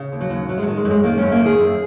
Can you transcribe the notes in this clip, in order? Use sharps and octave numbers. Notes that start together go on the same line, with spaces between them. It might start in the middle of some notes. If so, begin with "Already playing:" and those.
Already playing: C#3
D#2
F#3
D#2
F#2 F#3
G#3
F#3
D#3
G#3
F#2
G#3
D#3 A#3
F#2 C#4
A#3
D#3 G#4
F#2